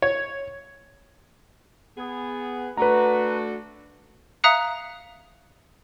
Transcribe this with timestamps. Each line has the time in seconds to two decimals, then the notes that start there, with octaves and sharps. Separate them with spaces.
0.02 C#5
1.98 B3 G#4
2.77 A3 D4 F#4 B4 A#5
4.44 E5 F5 A#5 D#6 F#6 C#7